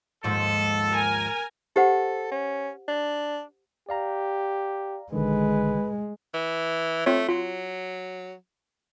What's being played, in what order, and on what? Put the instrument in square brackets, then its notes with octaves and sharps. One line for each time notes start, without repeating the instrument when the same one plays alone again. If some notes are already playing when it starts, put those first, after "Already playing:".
[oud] D#2 G#2 F3 [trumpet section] A4
[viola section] A#4 G#5
[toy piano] G4 C5 F#5 [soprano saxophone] A4
[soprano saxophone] C#4
D4
[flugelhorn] G4 [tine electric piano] D5 F5 A#5
[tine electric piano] A#1 D3 D#3 [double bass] G#3 [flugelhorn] B4
[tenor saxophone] E3
[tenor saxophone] A3 [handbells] C4 F4 C#5
[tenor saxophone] F#3 [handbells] F4